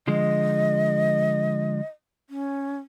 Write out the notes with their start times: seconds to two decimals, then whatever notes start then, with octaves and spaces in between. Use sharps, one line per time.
0.07 D3 F3 G#3 D#5
2.30 C#4